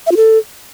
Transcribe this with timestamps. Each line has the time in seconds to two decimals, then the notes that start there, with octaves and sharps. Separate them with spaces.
0.06 E5
0.12 F4
0.17 A4